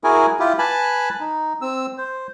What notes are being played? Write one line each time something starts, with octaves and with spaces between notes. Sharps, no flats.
E4 F#4 G#4 A#4 G#5
E4 F4 G4
B4 G#5 A5 B5
D#4
C4 E6
C5